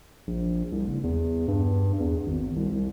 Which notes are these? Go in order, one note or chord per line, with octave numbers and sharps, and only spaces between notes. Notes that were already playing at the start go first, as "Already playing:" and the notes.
A#1
C2
F#1
E2
G2
E2
G#1
C2
C2